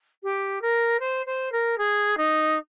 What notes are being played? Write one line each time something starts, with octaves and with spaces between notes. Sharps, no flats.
G4
A#4
C5
C5
A#4
G#4
D#4